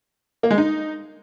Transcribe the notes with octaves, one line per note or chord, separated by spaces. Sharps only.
A#3
G#3
D#4